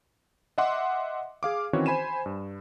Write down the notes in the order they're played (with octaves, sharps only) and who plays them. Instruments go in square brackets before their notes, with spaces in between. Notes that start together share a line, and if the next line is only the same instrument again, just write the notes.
[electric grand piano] D#5 E5 F#5 C6 D6
G#4 F5 D6
D#3 E3 C4 C#4 F#4 C#5
C5 G#5 B5 D#7 E7
G2